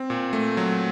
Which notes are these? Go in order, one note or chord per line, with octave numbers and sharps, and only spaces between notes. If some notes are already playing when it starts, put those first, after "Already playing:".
Already playing: C4
A#2
A3
F#3